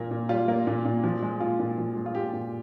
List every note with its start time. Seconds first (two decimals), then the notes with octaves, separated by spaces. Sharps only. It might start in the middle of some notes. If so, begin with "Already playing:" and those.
Already playing: A#2 G3 A#3
0.11 A#2
0.29 G3 F4
0.48 A#3
0.67 A#2
0.85 A#2
1.04 F3
1.23 G#3
1.40 A#2 F4
1.60 A#2
1.78 F3
1.96 G#3
2.06 F4
2.15 A#2 G4
2.33 A#2